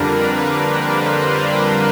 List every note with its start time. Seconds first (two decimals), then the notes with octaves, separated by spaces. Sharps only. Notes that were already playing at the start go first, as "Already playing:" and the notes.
Already playing: F2 D3 G3 A#3 D4 A#4 B4
0.44 C5
0.87 B4
1.29 A#4